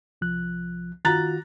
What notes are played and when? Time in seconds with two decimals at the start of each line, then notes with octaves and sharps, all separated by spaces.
0.21 C2 F3 F#6
1.05 D#3 F4 F#4 A#5 F#6 A6